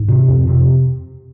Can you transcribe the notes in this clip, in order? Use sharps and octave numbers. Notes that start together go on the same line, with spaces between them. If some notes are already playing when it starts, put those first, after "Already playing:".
Already playing: G#2
C3
F2
C3